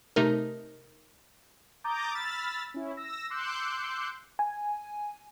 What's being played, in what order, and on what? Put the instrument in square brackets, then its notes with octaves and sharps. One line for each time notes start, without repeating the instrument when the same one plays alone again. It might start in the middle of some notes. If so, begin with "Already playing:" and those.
[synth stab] C3 A3 D#4 A#4
[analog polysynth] A#5 D6 D#6 G6 A6
B5 E6 F6 A6 B6
C#4 E4
E6 A#6
C6 D6 E6 F#6 G6 C#7
[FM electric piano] G#5